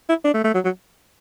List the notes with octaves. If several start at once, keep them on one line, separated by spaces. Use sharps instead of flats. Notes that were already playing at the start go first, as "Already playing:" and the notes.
E4
D4
A3
A3
F#3
F#3